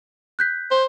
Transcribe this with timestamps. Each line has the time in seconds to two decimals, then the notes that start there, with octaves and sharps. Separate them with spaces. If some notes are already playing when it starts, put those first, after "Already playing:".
0.39 F#6 G6 B6
0.71 C5